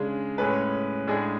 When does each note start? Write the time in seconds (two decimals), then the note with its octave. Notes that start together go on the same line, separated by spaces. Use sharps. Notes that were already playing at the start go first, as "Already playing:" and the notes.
Already playing: C#3 G#3 D4
0.38 A2 G#3 C#4 G#4 B4
1.07 A2 G#3 D4 G#4